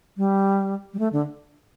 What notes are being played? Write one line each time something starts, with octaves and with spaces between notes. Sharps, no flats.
G3
G3
A3
D3